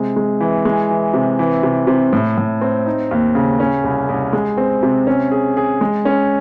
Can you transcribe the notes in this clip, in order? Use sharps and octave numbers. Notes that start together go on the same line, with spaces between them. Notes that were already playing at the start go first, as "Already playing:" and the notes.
Already playing: C3 G#3
G#3
E3
G#3
E3
C3
E3
C3
C3
A2
A2
C4
D#4
D#2
C#3
C#4
C2
C2
G#3
C4
C3
C#4
G#4
G#4
G#3
C#4